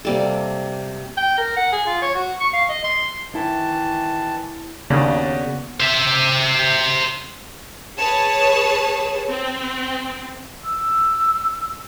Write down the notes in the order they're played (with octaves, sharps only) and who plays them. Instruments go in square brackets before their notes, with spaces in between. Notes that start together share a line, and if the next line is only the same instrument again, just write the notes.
[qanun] C3 G3 A#3 A4
[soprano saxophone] G5
A#4
F#5
G#4
F4
C#5
F#4
C#6
F5
D#5
C6
[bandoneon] D#3 E3 A5 [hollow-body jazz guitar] E4
[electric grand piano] D#2 D5 [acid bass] C#3 [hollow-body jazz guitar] A#3 B3 D4 [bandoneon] F#4
[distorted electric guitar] C5 E5
[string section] G#4 B4 C#5 A5
C4
[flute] E6